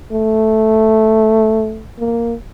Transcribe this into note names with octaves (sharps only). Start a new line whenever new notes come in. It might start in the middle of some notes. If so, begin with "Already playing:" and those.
A3
A#3